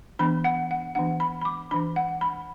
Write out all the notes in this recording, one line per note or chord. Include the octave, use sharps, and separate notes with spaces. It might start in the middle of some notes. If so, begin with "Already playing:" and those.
E3 B3 D4 B5
F#5
F#5
E3 B3 D4 F#5
B5
B5
D6
E3 D4 B5
F#5
B5